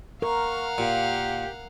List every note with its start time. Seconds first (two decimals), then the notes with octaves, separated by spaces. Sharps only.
0.22 A#4 F5 F#5 C#6
0.78 A#2 G4